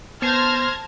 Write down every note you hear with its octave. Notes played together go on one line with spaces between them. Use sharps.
B3 C5 A5 F6 G#6 A#6